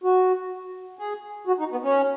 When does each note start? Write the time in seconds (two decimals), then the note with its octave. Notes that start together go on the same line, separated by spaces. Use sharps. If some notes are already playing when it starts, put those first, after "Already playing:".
0.04 F#4
0.99 G#4
1.47 F#4
1.59 D#4
1.71 B3
1.84 C#4